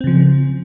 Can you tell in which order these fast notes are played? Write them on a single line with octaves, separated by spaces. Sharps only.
C4 C#3 F3